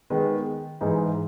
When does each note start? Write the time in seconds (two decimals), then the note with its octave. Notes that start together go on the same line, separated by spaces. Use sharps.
0.10 D#3 G#3 B3
0.81 G#2 E3 G#3 D#4